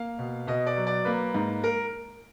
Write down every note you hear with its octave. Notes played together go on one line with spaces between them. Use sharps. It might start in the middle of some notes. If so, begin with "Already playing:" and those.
Already playing: A#3 F5
B2
B2 D#5
D5
F#3
D5
A#3 B4
G#2
A#4